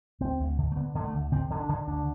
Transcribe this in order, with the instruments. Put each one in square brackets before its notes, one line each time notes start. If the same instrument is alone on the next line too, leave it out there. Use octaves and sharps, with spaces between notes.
[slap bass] D2 C4
D2
D3
A3
D3 B3
D3 B3
A3
D2
D3 C4
D3
D4
D3
D2 D4